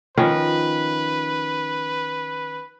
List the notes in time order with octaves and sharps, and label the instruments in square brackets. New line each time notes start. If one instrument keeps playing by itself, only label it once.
[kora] D#3 F3 C#4 [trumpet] B4